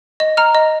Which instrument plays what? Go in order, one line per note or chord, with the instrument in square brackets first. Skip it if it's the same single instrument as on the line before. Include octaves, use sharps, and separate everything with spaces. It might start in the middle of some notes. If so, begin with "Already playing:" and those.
[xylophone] D#5
A#5 F6
D#5